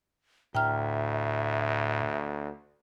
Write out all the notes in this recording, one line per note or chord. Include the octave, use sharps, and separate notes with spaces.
D2 A2 E5 G5 A#5 F6